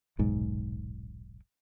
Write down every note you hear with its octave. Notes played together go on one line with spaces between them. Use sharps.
D#1 B1 G#2